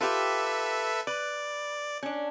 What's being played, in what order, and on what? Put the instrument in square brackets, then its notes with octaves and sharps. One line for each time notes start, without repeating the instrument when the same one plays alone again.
[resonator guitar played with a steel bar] F4 G4 [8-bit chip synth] A4 B4 E5
[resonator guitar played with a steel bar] B4 [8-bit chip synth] D5
[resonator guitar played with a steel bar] C#4 D4